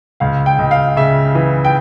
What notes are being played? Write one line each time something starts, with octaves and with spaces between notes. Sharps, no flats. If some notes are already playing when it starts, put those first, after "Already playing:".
C#2 F5
G5
C#2
F5
C#3 E5
E3
G5